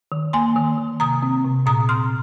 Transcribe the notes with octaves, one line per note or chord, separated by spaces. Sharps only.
D#3
A#3 G#5 C6
D#3
D#3
C3 A#5 D#6
C4
C3
A#2 A#5 D#6
C4 C6 F6